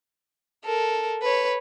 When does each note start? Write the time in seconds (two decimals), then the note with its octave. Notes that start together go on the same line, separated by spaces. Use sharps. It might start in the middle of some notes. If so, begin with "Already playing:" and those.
0.65 A4 A#4
1.22 B4 C#5